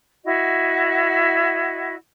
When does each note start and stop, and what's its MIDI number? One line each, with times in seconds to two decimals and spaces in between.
0.24 1.93 64
0.24 1.93 66
0.24 1.93 75